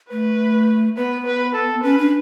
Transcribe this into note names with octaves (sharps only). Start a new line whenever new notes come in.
A3 B4
B3 B4
B4
A4
C#4 B4
D4